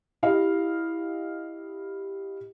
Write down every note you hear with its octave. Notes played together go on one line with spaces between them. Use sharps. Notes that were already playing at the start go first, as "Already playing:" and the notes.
E4 G4 D#5 F5